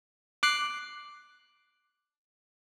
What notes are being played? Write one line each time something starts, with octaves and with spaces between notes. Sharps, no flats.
D6 F#6 C7